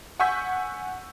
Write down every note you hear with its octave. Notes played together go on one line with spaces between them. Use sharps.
F#5 G#5 C#6 E6 G6 B6